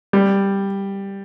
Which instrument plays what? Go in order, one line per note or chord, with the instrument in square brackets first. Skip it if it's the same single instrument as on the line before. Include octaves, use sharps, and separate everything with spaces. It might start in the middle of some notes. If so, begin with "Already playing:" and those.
[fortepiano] G3